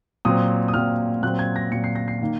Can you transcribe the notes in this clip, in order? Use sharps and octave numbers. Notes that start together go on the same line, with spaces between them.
A#2 F#3 C4 D#6
D#6
A#2 F#3 C4 F6
A#2 F#3 C4 F#6
G#6
A#6
A#2 F#3 C4 C#7
C7
A#6
C7
D#3 A#3